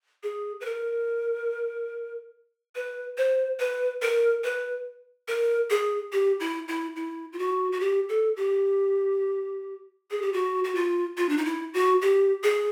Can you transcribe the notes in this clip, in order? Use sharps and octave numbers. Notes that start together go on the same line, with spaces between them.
G#4
B4
A#4
B4
C5
B4
A#4
B4
A#4
G#4
G4
E4
E4
E4
F4
F#4
F#4
G4
A4
G4
G#4
G4
F#4
F#4
F4
F4
D4
D#4
E4
F#4
G4
G#4